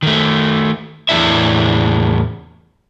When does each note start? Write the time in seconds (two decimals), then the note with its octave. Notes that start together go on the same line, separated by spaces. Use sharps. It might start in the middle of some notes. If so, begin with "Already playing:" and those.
0.03 D#3 A3
1.09 E2 A2 F3 D4 E4 E5